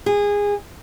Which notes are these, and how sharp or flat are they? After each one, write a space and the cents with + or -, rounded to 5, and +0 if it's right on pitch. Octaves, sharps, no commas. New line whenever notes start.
G#4 -20